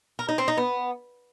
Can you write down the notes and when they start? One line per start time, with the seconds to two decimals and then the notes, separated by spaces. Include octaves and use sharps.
0.19 A#4
0.29 D#4
0.38 C4
0.48 D#4
0.57 B3